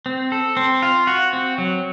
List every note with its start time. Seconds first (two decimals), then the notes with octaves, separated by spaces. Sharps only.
0.06 C4
0.32 A4
0.57 C4
0.82 F4
1.07 F#4
1.33 C4
1.58 F#3